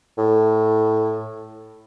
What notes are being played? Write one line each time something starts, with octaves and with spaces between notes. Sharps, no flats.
A2